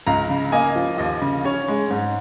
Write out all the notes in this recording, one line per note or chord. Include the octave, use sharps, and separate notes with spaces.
C#2 F5 A#5
C#3
A#3 D#5 G#5
F3
D#2 D#5
C#3
C#4 C#5
G#3
G#2